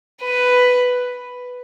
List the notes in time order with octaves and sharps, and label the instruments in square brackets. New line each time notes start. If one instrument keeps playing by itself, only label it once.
[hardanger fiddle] B4